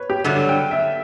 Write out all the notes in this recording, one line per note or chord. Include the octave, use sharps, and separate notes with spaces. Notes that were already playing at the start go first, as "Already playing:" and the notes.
Already playing: B4 C#5
G4
G2 D3 F#3 A3 A4
G5
E5